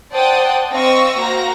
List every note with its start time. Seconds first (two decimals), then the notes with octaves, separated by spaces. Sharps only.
0.13 C5 D5 F#5 G5 A5 D#6
0.72 C4 D#5 F5 C#6 E6 A#6
1.19 A#3 F#4 C5 F5 A#5